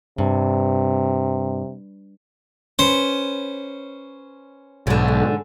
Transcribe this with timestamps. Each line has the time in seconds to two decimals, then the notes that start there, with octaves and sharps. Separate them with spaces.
0.18 G2 C3
2.79 C#4 B4 C5
4.87 B1 G#2 D3